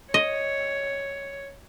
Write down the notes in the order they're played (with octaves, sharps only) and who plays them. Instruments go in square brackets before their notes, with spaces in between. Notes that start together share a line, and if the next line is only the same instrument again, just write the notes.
[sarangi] C#5 [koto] D#5